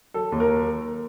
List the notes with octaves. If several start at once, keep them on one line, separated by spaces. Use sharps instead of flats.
F#3 A4
D#2
A#4